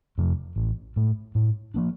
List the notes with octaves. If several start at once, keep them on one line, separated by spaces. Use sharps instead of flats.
F2 C3 F3
A1
A2 A3
A2
F3 A#3 D4